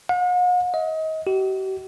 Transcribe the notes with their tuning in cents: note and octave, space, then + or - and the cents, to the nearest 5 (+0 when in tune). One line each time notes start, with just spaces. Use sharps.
F#5 -45
D#5 +30
G4 -45